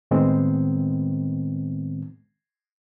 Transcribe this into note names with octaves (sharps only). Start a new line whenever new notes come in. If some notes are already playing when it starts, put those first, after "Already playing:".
A2 D#3 G#3 B3 C4